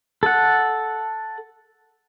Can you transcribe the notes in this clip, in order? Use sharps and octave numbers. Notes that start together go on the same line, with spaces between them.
A4 F#5